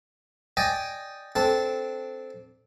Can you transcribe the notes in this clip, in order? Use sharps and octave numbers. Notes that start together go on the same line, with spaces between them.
D5 D#5 G5 G#5
C4 D4 A4